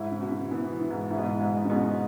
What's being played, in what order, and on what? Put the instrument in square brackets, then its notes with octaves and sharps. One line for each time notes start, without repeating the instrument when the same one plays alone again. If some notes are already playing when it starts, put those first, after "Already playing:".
Already playing: [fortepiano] G#2 [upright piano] E4
[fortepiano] C#3
[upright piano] B2
[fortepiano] C#3
[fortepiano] E3 [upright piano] B3
[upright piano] E3
[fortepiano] G#2
[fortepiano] G#2 [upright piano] E4
[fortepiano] B2
G#2
[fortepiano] G#2 [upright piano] G#3
[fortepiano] C#3
[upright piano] G#2 [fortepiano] B2